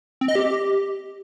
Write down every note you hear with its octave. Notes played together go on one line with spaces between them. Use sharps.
C4
D#5
G4